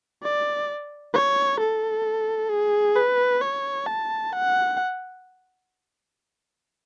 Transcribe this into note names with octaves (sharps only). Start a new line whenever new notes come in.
D5
C#5
A4
G#4
B4
C#5
A5
F#5